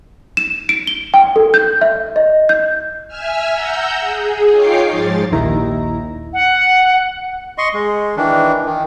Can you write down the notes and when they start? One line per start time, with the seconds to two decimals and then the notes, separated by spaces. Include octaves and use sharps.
0.37 E7
0.69 D7
0.87 G7
1.14 G5
1.36 A4
1.54 G6
1.81 E5
2.16 D#5
2.49 G6
3.08 E5 G#5 E6 F6
3.52 F#5 A#5 E6 G6
4.00 G#4
4.51 D#4 F4 C#5 G5 D6 C7
4.90 G#2 F3 A6
5.32 A#1 D#2 A#2 D#3 E4 A#5
6.33 F#5
7.58 D#5 C6 C#6
7.74 G#3
8.17 D#3 E3 D4
8.66 D#3